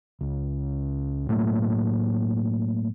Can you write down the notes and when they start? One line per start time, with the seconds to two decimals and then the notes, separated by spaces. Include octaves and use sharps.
0.21 C#2
1.29 A2 F#3 A3 A#3